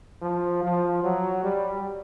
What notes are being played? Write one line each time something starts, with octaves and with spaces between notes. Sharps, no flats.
F3
F3
F#3
G3